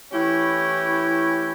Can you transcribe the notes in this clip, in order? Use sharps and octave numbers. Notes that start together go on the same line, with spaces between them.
E3 A3 C#4 E4 G4